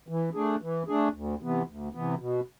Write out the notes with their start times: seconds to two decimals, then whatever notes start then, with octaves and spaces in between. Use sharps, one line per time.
0.08 E3
0.35 A3 D4 G#4
0.62 E3
0.88 A3 D4 G#4
1.14 D2
1.41 C3 E3 B3
1.68 D2
1.93 C3 E3 B3
2.19 B2